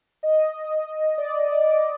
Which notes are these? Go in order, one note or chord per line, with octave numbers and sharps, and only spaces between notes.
D#5
D5
D5